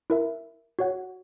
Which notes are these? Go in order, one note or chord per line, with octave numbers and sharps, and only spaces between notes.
E4 A#4 E5
F#4 C#5 F#5